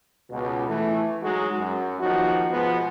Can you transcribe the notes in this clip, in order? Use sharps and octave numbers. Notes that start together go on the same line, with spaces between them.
C#2 B2
E3 A3
F#3 G#3 D#4 F#4
F#2
D#2 F3 D#4 F#4
B2 F3 G#3 B3